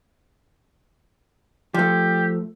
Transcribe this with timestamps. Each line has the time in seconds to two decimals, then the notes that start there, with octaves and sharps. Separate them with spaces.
1.74 F3 A3 G4